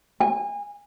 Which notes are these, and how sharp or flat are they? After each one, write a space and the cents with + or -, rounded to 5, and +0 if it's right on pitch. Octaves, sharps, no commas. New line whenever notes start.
G#5 -30